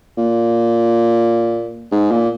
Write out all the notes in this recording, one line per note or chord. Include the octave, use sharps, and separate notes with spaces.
A#2
G#2
A#2